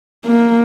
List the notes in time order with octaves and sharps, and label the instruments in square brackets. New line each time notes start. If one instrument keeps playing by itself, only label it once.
[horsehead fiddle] A#3